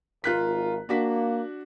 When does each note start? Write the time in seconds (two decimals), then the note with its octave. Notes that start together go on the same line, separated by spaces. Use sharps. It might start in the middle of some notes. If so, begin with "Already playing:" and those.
0.24 G#1 F4 A#4 F#6 B6
0.89 A#3 D4 F#4 B6